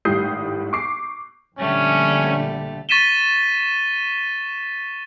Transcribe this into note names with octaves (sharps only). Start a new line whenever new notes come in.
G#1 A2 G3 D#6 G6 C7
C#6 D6 C7
A#1 D3 G3 A3 C#4 G4
C#6 A6 B6 D#7 E7 G7